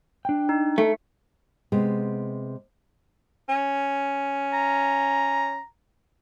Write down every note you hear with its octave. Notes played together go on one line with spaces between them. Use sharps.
D4 G5
D#4
A3
C3 G#3 B3
C#4
A#5